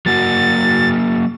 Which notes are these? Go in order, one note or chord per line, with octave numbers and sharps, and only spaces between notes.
F#3 A#3 F#4 A6